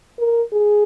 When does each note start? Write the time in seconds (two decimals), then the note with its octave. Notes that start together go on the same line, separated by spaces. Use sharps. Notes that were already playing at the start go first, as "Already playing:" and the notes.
0.19 A#4
0.52 G#4